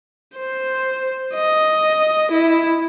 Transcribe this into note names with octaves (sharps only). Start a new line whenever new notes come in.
C5
D#5
E4